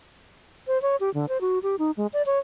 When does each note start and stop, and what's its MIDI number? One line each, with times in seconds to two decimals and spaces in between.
0.67 0.81 72
0.82 0.96 73
1.00 1.12 67
1.14 1.29 50
1.29 1.41 72
1.41 1.59 66
1.63 1.76 67
1.79 1.91 63
1.97 2.07 56
2.13 2.22 74
2.26 2.39 73